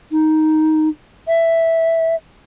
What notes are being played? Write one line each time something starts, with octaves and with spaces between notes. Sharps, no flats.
D#4
E5